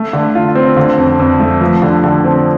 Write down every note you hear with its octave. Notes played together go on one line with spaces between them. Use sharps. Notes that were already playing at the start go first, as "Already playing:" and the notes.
Already playing: A3
D3
F4
C4
D3
F2
F2
A3
F3
D3
D3
C4